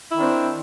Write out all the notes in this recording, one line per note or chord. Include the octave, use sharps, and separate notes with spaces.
D#3 C4 D4 E4